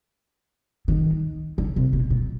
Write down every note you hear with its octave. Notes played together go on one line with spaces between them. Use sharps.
D#3
D3
C3
B2
A#2